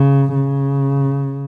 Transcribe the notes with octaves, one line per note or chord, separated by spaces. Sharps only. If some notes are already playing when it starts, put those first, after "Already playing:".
Already playing: C#3
C#3